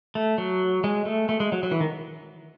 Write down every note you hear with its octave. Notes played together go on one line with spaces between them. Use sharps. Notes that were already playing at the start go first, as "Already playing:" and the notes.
A3
F#3
G#3
A3
A3
G#3
F#3
F#3
E3
D#3